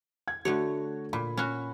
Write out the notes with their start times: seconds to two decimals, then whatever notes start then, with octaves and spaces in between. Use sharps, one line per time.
0.28 G#6
0.45 D3 A3 F#4 C#5
1.13 A#2 B5
1.37 C#4 F#4